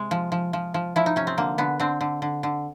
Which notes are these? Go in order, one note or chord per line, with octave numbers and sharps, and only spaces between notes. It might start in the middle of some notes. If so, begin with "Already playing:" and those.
Already playing: C3 G#3
F3
F3
F3
F3
F3 E4
D#4
C3 C#4
C4
D3 A#3
D3 B3
D3 C4
D3
D3
D3